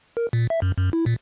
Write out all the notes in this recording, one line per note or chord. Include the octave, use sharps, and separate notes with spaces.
A#4
A#2
E5
F#2
F#2
E4
A#2